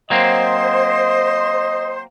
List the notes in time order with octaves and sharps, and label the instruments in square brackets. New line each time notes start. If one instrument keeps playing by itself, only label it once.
[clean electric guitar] F#3 A#3 C4 [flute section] C5 [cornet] D#5